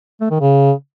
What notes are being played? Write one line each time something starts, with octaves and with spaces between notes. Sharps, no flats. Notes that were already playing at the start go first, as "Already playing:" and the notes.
A3
D#3
C#3